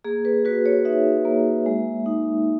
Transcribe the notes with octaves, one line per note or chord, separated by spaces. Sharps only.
A#3 G#4
B4
F#4 B4
C#5
D#4 E5
A#3
G#3
D#4